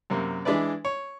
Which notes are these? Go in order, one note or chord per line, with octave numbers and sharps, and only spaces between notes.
F#2 C3 A#3
E3 G#3 D4 E4 B4 D5
C#5